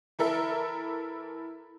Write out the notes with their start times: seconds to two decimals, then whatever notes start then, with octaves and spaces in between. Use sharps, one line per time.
0.19 E3 E4 A4 A#4 E5